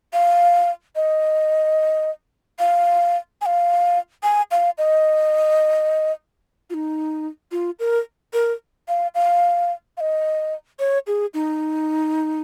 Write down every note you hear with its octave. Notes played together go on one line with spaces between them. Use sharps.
F5
D#5
F5
G#5
F5
G#5
F5
D#5
F4
D#4
F4
A#4
A#4
F5
F5
F5
D#5
C#5
G#4
D#4